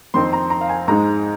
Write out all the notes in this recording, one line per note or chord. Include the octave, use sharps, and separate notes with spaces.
F2 D#3 C4 D#4 C6
A#5
A#5
F5
G#5
G#2 G#3 D#4 A#5